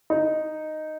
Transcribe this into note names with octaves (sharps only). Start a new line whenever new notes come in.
D#4